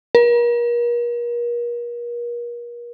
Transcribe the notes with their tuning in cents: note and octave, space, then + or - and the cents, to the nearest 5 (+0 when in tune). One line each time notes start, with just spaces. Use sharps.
A#4 +40